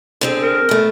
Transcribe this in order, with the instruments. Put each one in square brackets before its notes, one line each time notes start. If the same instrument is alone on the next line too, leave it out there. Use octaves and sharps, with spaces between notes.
[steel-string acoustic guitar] D3 C4 G#4
[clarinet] A#4
[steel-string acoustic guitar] A3 B3